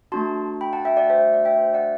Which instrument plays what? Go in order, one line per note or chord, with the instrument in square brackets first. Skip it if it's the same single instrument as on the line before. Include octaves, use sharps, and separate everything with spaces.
[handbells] A3 D4 F#4 A5 C6
G5 B5
F#5 A5
E5 G5
D5 F#5
C5 E5
D5 F#5
E5 G5
C5 E5
D5 F#5